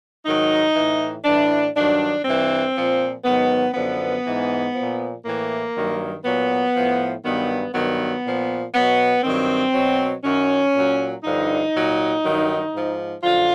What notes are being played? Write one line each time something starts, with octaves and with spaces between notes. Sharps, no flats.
G#2 D#3 F#3 D#4
A2 E3
A2 E3 D4
G2 D#3 F#3 D4
G2 E3 C4
A#2 F3
G#2 D#3 F#3 B3
F#2 D3 F3 B3
G#2 E3
A#2 F3
A2 E3 A#3
G2 D#3 F#3
A#2 F#3 B3
A2 F3
G2 D#3 F#3 B3
G2 D#3 F#3 B3
A#2 F3
B2 F#3 B3
G2 D#3 F#3 C4
B2 F#3
F#2 D#3 F#3 C#4
A#2 F#3
G2 D3 F3 D#4
A#2 F#3
G2 D#3 F#3
G#2 F3
F#2 D3 F3 F4